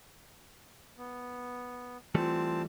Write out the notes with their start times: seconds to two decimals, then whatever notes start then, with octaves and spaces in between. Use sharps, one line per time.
0.98 B3
2.15 E3 G3 A3 C4 F4 A5